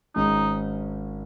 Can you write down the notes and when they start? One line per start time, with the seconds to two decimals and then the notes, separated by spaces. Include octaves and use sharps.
0.16 G#1 G#2 G#3 C#4 D#4 G#4